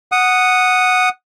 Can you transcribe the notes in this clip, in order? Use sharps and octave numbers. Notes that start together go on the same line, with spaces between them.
F#5 D#6